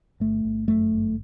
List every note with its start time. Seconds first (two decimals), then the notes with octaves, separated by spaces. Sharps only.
0.20 G1 A3
0.45 G1
0.68 F#2 A3
0.92 G1